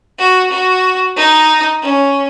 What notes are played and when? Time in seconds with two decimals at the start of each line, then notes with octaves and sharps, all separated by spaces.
0.19 F#4
0.51 F#4
1.17 D#4
1.82 C#4